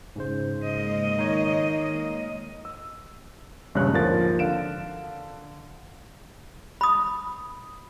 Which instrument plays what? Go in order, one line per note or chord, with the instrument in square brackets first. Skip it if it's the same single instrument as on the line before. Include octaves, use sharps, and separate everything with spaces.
[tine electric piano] G#2 C#3 C5
[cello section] G#3 A#3 D#5
[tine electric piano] D#3 D#4 C#5
[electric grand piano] E6
A#1 G2 C#3 G#3 C#5 F#6
G#1 D#2 D3 F3 A#4 A6
D3 F5 D7 E7
[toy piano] B5 D#6